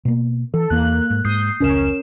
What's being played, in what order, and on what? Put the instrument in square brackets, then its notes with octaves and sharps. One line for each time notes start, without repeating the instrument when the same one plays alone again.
[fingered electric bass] B2 A#3
[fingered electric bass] E3 [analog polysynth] A4
[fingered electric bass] E2 E3 [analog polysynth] A#3 F#6
[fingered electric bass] G#2
[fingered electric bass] G#2 [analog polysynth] D#6 G6 C7
[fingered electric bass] F1 C#2 C#3 [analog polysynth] C#4 A#4 E7